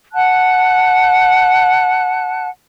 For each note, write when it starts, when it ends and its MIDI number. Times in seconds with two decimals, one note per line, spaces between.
0.13 2.48 78
0.13 2.48 81
0.13 2.48 90